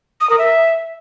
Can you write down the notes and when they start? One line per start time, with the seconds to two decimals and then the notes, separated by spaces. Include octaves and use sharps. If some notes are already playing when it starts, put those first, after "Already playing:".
0.21 D#6
0.30 A#4
0.38 E5